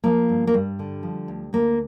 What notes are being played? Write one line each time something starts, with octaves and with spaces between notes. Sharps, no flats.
F3 A#3
G2
A#3
G2 G3
D3
F3
D2
D2 A#3